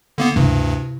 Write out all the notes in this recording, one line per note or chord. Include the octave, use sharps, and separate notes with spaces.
D3 A#3 B3
D2 G2 C3 E4